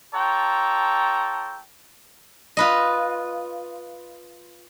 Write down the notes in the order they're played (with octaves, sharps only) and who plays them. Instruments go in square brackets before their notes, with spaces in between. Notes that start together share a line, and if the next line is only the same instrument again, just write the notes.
[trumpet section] F4 A4 C#5 G5 A5 A#5
[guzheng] F4 B4 D#5